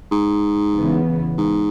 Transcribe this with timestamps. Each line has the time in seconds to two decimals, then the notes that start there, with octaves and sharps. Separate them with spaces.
0.12 G#2
0.74 E2 C#3 E3 B3
1.38 G#2